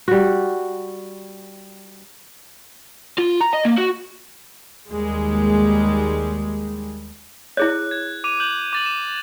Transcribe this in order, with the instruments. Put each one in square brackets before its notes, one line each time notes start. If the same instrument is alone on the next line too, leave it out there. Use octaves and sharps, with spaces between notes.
[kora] G3 F#4
[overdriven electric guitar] F4
A#5
D#5
A#3
F#4
[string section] D#2 G3 G#3
[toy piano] E4 G#4 C#5 [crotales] F#6
[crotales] G#6
D6 D#7 F7
F#6 G6 F#7
D6 A6 F#7
E7